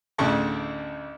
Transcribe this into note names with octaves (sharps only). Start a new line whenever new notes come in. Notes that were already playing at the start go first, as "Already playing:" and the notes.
A1 D2 A2 C#3 A5 C#6